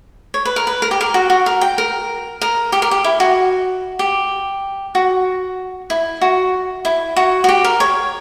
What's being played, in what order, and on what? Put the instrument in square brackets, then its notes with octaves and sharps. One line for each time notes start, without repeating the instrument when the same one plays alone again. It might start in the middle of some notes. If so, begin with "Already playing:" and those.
[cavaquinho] C#5
B4
A#4
B4
A#4
G4
A#4
F#4
F#4
A#4
G5
A#4
A#4
G4
A#4
G4
E4
F#4
G4
F#4
E4
F#4
E4
F#4
F#4
G4
A#4
C#5